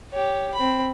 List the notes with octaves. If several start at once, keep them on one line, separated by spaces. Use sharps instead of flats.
G4 C#5
C4 B5